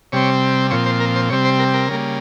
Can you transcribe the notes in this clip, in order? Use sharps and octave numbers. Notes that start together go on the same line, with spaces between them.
C3 G3 C4 C#5
A#2 F3 C4 C#5
C5
A#4
C5
C3 G3 C4 C#5
C5
A#4
A#4
C#3 G3 A#3